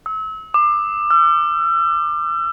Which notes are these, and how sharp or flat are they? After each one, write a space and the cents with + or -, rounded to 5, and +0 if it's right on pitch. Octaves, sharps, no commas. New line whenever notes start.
E6 -35
D6 +25
E6 +45